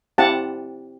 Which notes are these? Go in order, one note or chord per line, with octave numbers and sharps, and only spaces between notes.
C4 E4 G4 F#5 A5